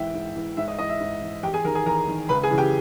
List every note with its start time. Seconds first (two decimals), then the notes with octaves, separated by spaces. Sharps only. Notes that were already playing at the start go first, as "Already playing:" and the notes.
Already playing: G#2 E3 E5 G5
0.14 G#2
0.36 E3
0.57 G#2 E5
0.68 D#5
0.78 E3 D#5
0.89 E5
1.00 G#2
1.22 E3
1.43 E2 G4 G5
1.54 G#4 G#5
1.64 D#3 A#4 A#5
1.75 G#4 G#5
1.86 E2 A#4 A#5
2.08 D#3
2.29 C#2 B4 B5
2.43 G#4 G#5
2.50 C#3 E3
2.58 G4 G5